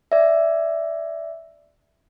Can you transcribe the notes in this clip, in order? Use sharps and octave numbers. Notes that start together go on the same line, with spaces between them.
D5 E5